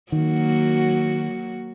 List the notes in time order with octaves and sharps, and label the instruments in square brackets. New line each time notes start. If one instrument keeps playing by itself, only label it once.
[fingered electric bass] D#3 [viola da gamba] F#3 A#3 F#4